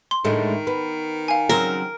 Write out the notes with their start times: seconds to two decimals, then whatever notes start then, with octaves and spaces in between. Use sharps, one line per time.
0.11 C6
0.24 A2 D3 D#3 G#3
0.67 B3
1.28 F5 G#5
1.49 C#3 F#3 C4 A#4